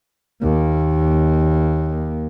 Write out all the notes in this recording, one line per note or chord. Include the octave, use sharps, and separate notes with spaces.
D#2 A#3